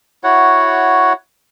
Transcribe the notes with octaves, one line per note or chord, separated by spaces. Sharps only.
E4 F#4 C#5 F#5